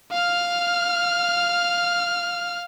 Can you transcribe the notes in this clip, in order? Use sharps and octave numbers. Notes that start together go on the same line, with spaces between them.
F5 F6